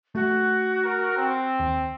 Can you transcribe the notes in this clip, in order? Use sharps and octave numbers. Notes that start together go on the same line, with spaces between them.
A3 F#4
A#4
C4
D#2